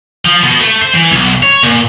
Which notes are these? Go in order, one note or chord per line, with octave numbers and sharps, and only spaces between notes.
F3
B2
A3
C5
E3
B1
C#5
A#2